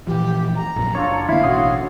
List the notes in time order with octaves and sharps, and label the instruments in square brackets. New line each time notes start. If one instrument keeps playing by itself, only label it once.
[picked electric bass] A#2 E3 F3 [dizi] G4
[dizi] A#5
[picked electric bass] A#1 F#2 A#2
[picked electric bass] F#1 [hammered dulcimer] D4 F4 A4 [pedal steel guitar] C#5
[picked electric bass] D3 A#3 [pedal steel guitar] E4 [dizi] F5
[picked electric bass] A1 B2 C#4 [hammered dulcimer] F#4 [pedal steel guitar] C#5 C6 D#6